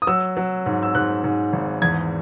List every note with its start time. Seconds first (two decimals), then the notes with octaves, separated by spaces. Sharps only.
0.02 D#6
0.07 F#3 E6
0.37 F#3
0.66 G#2
0.83 E6
0.95 G#2 F#6
1.24 G#2
1.53 G#1
1.82 E2 G#6